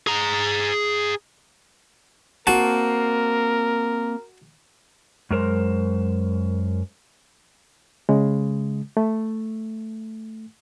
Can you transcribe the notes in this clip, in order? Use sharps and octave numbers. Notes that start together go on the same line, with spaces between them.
G#4 A#5
A#3 C4 F#4 A#4 A5
F#2 G#3 A#4 C5
C#3 G#3
A3